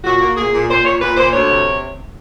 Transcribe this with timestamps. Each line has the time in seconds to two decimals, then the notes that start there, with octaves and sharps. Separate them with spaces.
0.05 A#2 F#4
0.21 A#3
0.36 A#2 G#4
0.52 A#2
0.68 A#2 C5
0.85 A#2 C#5
1.01 A#2 B4
1.16 A#2 C5
1.33 D2 C#5
1.49 C3